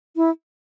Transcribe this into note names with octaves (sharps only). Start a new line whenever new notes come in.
E4